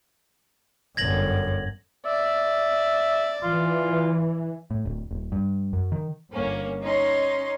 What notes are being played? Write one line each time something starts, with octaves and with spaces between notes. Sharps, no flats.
G1 F#2 G#6 A#6 F#7
D5 E5
E3 F4
A2
D1
D#1
G2
F#2
D#3
G1 A#3 C#4
C#4 D#4 C6